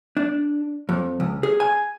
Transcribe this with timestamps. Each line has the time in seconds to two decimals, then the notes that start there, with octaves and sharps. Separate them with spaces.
0.17 D4
0.89 F2
1.20 C#2
1.43 G#4
1.60 G#5